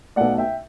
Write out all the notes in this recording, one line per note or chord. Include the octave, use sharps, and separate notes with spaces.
B1 B2 A3 D5 F#5
E5 G5